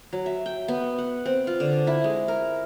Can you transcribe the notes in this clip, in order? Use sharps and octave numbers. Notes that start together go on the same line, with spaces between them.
F#3
E5
G5
B3
F#5
C4
F4
D3
E4
G#3
A#4